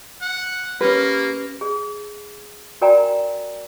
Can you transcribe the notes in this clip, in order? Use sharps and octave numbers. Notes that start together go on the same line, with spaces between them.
F#5
A#3 C#4 G4 B4
G#4
F#4 A#4 D5 G5 G#5 A#5